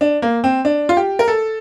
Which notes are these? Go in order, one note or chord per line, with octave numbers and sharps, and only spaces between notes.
D4
A#3
C4
D4
F4
G4
A#4
A4